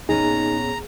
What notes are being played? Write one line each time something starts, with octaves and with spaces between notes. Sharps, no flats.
A#2 B3 C#4 D#4 G#4 A#5